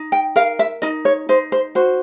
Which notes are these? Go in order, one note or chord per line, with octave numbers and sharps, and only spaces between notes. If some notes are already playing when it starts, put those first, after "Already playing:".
Already playing: D#4
G5
A#4 F5
E5
D#4 D#5
C#5
D#4 C5
C5
F#4 C5